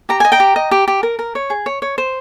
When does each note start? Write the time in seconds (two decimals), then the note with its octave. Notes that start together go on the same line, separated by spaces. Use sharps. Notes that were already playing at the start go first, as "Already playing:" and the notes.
0.09 G4 A#5
0.20 D#5 G#5
0.32 G5 A#5
0.40 G4
0.56 D#5
0.71 G4
0.88 G4
1.03 A#4
1.19 A#4
1.35 C#5
1.50 G#4
1.66 C#5
1.82 C#5
1.98 C5